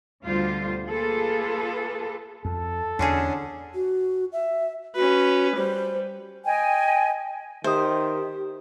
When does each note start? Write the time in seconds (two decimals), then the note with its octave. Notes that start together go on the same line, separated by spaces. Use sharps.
0.23 D2 B2 D3 G3 F4 C5
0.87 A#3 F4 G#4 A4 B4
2.45 F2 A4
2.99 E2 D3 C#4 D4 F#4 G#4
3.75 F#4
4.33 E5
4.95 C#4 F#4 B4
5.56 G3 C5
6.45 D#5 G5 G#5
7.64 D#3 G4 C5 E5 D#6